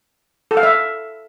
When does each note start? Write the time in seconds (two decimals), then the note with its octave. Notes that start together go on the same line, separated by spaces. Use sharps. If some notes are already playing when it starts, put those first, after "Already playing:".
0.51 A4
0.57 F5
0.63 E5